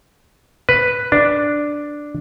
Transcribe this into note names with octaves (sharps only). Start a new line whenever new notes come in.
B4
D4